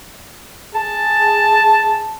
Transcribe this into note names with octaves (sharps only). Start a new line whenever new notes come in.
G#4 A5